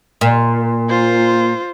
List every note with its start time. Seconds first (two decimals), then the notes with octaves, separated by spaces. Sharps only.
0.21 A#2
0.89 F4 C5